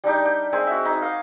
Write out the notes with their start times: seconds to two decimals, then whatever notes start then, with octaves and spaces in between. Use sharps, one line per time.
0.04 G3 D4 D#4 G4
0.25 G5
0.52 G#3 C4 G#5 B5
0.67 F#4 E5
0.85 D#4 B5 D6
1.02 D#5 F5